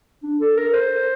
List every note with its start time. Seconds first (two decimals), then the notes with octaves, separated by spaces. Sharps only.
0.23 D4
0.40 A4
0.57 A#4
0.73 C5